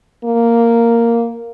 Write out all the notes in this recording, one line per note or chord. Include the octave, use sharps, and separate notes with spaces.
A#3